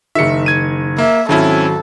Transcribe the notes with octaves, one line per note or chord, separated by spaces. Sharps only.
F#1 D#3 E5 C#7
G#6 D#7
A#3 E5
G#1 F#3 C4 C#4 E4 A4